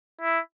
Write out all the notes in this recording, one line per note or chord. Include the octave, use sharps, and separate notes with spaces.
E4